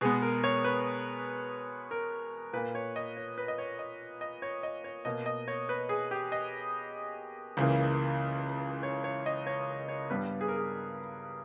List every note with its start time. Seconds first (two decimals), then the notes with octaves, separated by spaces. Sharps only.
0.01 B2 G#3 B3 G#4
0.22 A#4
0.44 C#5
0.64 B4
1.91 A#4
2.53 A#2 A#3 B4
2.75 C#5
2.96 D#5
3.17 C#5
3.38 B4
3.48 D#5
3.58 C#5
3.79 D#5
4.21 D#5
4.42 C#5
4.63 D#5
4.84 C#5
5.05 B2 A#3 D#5
5.26 D#5
5.48 C#5
5.69 B4
5.89 G#4
6.11 G4
6.32 D#5
7.57 C#2 C#3 E3 A#3
8.83 C#5
9.04 C#5
9.26 D#5
9.47 C#5
9.88 C#5
10.10 G2 G3 B3 B4
10.41 G#4
10.48 A#4
10.56 G#4